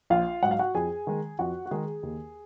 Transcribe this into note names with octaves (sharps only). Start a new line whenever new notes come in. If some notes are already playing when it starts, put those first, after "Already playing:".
A#1 F4 F5
G#2 F#3 F#5
F5
F#4 F#5
F2 G#4 G#5
D#3 G#3
F2 F#4 F#5
F#4
D#3 G#3 G#4
D#2